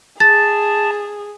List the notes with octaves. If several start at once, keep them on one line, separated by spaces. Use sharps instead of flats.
G#4 A5 A6